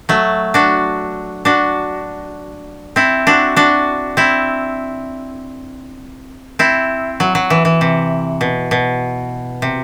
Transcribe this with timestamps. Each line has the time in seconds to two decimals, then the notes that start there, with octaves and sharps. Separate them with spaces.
0.09 F#3 A3
0.54 D4 F#4
1.45 D4 F#4
2.96 C4 E4
3.27 D4 F#4
3.56 D4 F#4
4.17 C4 E4
6.59 C4 E4
7.20 F#3
7.35 F#3
7.50 E3
7.65 E3
7.81 C3
8.41 B2
8.71 B2
9.62 C3